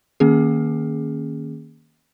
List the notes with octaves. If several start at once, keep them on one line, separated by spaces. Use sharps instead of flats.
D#3 A#3 C#4 G#4